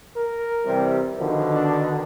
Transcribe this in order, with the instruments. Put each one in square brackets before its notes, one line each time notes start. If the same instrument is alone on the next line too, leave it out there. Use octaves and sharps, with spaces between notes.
[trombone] A#4
[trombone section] C3 E3 G3
[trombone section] B2 D3 D#3 [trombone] F3
[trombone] D4